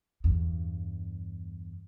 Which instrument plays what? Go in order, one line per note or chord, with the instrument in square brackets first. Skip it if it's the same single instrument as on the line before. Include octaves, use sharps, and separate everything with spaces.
[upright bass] E2 G2